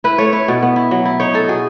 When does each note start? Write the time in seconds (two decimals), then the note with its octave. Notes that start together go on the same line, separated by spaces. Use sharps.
0.04 E4 B4
0.18 A3 C#5
0.33 E4 C#5
0.48 B2
0.62 B3
0.76 E4
0.91 F#3
1.05 E4
1.20 D#4 C#5
1.34 D#4 A4
1.48 B2 G#4